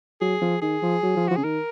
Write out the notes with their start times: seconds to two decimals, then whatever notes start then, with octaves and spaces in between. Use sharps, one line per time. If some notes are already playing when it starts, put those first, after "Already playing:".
0.21 F#3 G#4
0.42 F3
0.62 D#3 G#4
0.83 F3
1.03 F#3
1.16 F3
1.28 F3 F#4
1.36 C#3 G#4
1.44 D#3 A#4